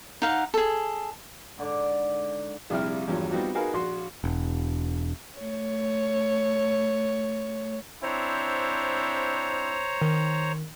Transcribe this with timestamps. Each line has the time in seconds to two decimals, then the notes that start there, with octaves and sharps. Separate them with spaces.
0.22 D#4 F5 F#5
0.54 G#4 A4
1.58 G#2 D3 D5 D6
2.70 A#1 C3 G3 E4 F6
3.08 E2 G2 F3 F#3
3.31 G3 B3 C4 D#4 F4 F#4
3.55 D#4 F#4 G#4 A#4 B4 F5
3.73 A#1 F#4 C6
4.24 E1
5.40 A3 C#5
8.03 C4 D4 E4 C5 C#5 A#5
10.02 D#3